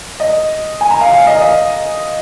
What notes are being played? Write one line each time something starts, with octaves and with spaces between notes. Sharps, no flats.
D#5
G#5
A#5
F5
F5
D#5
D#5